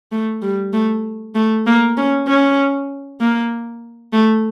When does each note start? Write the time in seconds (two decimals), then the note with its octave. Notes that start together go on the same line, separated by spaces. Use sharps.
0.12 A3
0.42 G3
0.73 A3
1.35 A3
1.67 A#3
1.97 C#4
2.28 C#4
3.20 A#3
4.13 A3